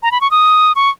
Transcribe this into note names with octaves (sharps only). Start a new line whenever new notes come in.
A#5
B5
C#6
D#6
C#6